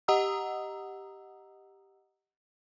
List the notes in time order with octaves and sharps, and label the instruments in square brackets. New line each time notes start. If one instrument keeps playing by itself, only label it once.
[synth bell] G4 D#5 F#5 A#5 D#6 E6